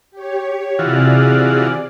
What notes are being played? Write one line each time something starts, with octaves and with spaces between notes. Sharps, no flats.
G4 C#5
C3 E3 F4 F#4 G#4 D5